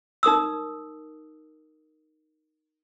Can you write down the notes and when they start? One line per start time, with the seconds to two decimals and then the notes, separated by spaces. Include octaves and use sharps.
0.23 D#4 A#4 D#6 E6